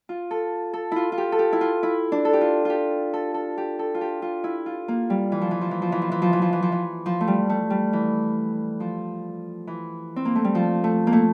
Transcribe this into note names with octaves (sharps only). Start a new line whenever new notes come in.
F4
A4
A4
E4 F4
F4
G4
A4
G4
E4
F4
E4
D4
A4
G4
F4
F4 G4
A4
A4
G4
A4
F4
G4
F4
E4
F4
A#3
G3
E3
F3
E3
F3
E3
F3
E3
F3
E3
F3
E3
F3
E3
F3
E3
F3
A3
G3
A3
G3
E3
F3
E3
C4
A#3
A3
G3
F3
A3
A#3
A3